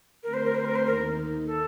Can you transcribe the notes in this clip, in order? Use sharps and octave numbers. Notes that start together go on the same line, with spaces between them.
D3 A3 C4 G4 A#4
C5
A#4
C5
A#4
C5
D#2 D#3 A#3 D#4 A#4
A4